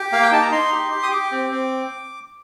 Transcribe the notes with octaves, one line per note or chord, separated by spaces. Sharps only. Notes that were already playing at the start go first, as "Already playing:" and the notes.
Already playing: G4 D6
A#3 F5
G5
D#4 A5
A#5
D#4 C6
G4
G4
D#6
G4 D6
C4
C4